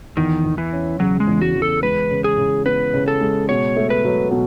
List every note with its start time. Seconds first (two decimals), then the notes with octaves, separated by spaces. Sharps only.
0.17 E2 D#3
0.45 E2
0.58 E3
0.73 C#4
1.00 C#3 F#3
1.20 G#3
1.27 E2
1.41 F#4
1.55 E2
1.62 A4
1.82 G#3 B4
2.10 C#3
2.24 G#4
2.38 C#3
2.66 B3 B4
2.94 C#3
3.08 A4
3.21 G#3
3.49 B2 C#5
3.76 A3
3.90 B4
4.05 F#3
4.31 B2